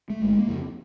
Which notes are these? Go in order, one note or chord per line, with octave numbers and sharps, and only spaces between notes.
A3
G1 G#3
A#3
F2 C#3